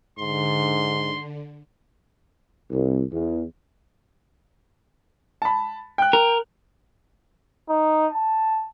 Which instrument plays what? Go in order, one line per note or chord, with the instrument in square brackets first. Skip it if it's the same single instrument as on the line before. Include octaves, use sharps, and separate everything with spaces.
[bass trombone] G#2 [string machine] D3 [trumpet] C6
[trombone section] C2
E2
[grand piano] A5 B5
G5 F#6
[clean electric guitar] A#4
[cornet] D#4
A5